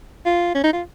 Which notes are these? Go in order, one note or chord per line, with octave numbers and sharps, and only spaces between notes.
F4
C#4
D#4
F4